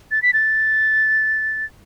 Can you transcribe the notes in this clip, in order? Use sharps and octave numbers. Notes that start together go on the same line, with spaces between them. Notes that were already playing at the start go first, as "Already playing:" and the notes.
A6
B6
A6